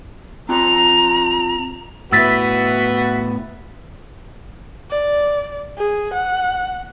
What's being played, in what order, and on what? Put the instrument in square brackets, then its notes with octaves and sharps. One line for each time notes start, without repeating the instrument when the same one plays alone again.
[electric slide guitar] C4 F4 A5 [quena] A#5
[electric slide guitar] A2 B3 E4 [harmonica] F#4 B4 [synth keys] E6 A6 B6
[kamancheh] D5
G#4
F#5